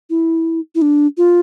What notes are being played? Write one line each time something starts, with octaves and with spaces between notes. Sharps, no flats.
E4
E4
D4
F4